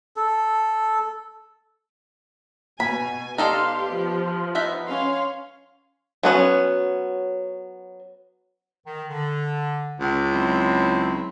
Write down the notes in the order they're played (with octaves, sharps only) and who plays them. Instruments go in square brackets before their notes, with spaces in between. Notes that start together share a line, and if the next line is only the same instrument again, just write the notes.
[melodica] A4
[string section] B2 [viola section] G#5 [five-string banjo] B5
[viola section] B3 G4 [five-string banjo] D#4 A4 D5 [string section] F5 C6
[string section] F3
[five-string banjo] B3 D#4 E5
[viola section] C#4 [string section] C#5 F5 C6
[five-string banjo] F#3 B3 C#4
[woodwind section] D#3
D3
[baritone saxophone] C#2
[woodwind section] F#3 C4 E4